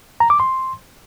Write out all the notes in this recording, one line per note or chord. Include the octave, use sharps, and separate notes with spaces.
A#5
D6
C6